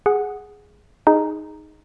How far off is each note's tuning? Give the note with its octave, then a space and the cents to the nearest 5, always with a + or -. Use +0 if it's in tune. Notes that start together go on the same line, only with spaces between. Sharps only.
G#4 +0 F#5 +0
D#4 +0 G#4 +0